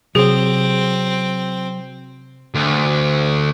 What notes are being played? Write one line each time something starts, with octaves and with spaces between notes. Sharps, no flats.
C3 F#3 C4 G#4
D2